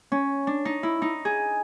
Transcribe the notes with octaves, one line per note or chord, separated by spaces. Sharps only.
C#4
D4
D#4
E4
D#4
G#4